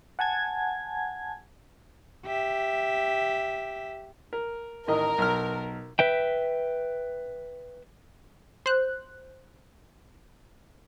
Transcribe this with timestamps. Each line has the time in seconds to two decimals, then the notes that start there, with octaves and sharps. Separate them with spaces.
0.19 F#5 G#5 A5 G#6
2.26 G4 E5
4.33 A#4
4.88 A1 D#3 A#4 D#5
5.18 B1 F6
5.99 B4 E5 G5
8.66 C5 F#6